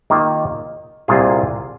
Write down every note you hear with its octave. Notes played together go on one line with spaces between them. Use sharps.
D#3 A#3 F4 A#4
C2 A#2 A#3 F4 G#4